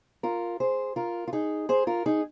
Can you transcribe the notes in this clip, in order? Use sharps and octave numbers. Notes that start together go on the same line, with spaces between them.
F4 A#4
G#4 C5
F4 A#4
F4
D#4 G#4
G#4 C5
F4 A#4
D#4 G#4